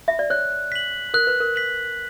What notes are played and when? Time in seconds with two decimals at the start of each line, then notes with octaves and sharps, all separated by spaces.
0.08 E5
0.19 D5
0.30 C#5 F#6
0.72 B6 F#7
1.14 A#4 F#6
1.27 B4
1.40 A#4
1.56 B6 F#7